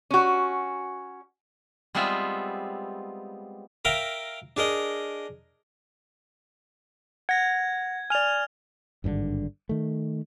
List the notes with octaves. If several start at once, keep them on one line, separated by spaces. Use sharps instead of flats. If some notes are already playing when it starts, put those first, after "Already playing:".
C#4 F#4
G3 G#3 B3 C4 F4 E5
A#4 E5 F5 G5 A#5
D4 G#4 A#4 D#5
F#5 G#6 A#6
D5 G#5 F6 F7
G#1 G2 B2 D3
D#3 A3